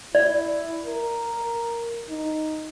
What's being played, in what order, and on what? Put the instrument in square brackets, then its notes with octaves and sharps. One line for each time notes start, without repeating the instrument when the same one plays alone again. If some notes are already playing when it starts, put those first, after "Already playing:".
[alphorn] E4 [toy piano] D5
[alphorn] A#4
D#4